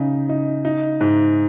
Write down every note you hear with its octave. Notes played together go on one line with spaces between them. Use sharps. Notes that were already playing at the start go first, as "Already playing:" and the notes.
Already playing: C#3 D#4
D#4
D#4
G#2